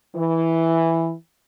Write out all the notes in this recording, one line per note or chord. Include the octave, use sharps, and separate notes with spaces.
E3